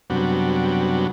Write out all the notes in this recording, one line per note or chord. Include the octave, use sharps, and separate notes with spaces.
F#2 C3 F#3 G3 B3 D4